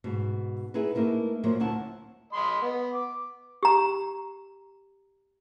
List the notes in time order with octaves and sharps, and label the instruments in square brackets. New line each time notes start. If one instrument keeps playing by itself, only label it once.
[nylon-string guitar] G#2 B2
B3 D#4 E4 G#4 B4
A3 A#3 D#4 E4 B4
A#2 F3 F#3 A#3
D2 D#3 E4 F#5 A5
[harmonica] D#5 B5 C6
B3
D6
[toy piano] G4 A#5